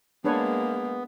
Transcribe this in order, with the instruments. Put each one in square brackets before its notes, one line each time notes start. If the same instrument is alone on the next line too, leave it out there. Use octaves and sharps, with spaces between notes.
[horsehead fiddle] G#3 A#3 [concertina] B3 [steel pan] D4 B4 C#5